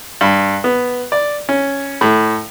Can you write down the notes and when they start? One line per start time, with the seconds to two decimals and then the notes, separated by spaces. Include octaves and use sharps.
0.21 G2
0.64 B3
1.12 D5
1.49 C#4
2.01 A2